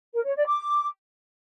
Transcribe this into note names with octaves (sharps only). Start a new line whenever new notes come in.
A#4
C#5
D5
D6